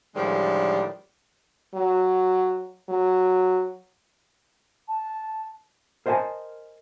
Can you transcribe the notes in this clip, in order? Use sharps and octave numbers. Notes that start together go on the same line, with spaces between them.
A2 D3 D#3 F3 G3 G#3
F#3
F#3
A5
A#4 C5 D#5 E5 G#5 A5